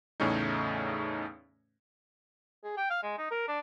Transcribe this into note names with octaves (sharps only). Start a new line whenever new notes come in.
E2 A2 C#3 A3 C#4 D#4
G#4
G5
F5
G#3
D#4
A#4
D4